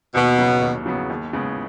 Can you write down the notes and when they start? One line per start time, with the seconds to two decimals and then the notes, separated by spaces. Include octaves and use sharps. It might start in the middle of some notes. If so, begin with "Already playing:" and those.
0.15 D#2 B2
0.38 C#3 F#3 B3
0.61 D#2
0.86 C#3 F#3 B3
1.10 D#2
1.33 C#3 G#3 B3